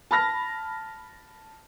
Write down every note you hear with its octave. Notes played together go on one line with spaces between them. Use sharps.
A5 B5 F6 A#6